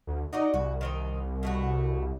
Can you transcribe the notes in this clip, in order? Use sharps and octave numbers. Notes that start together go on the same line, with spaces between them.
D2
D#4 F#4 D5 D#5
C2 F#4
D#3 C4 D#4
B2 A3 F#4